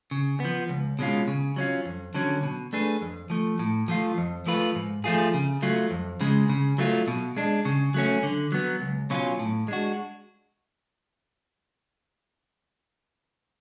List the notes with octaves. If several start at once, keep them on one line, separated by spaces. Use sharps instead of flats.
C#3
F3 B3
C#2
B2 G#3 C#4 F4
C#3
F#3 C#4 F4
F2
D3 F#3 C#4
B2
A3 D4 G#4 B4
F2
F3 A3
A2
F3 A3 F4
F2
F3 A3 F4 B4
G#2
F3 A3 F4 G#4
C#3
F#3 A3 F4
F2
C#3 G#3
C#3
F#3 A3 F4
B2
G#3 D4
C#3
F#3 A3 C#4
D3
F#3 B3
C#2
B2 F#3 C#4 F4
A2
G#3 D4 F#4